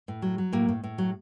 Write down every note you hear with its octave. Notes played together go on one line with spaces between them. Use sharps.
A2
F#3
F#3
A2 A#3
A2
A2
F#3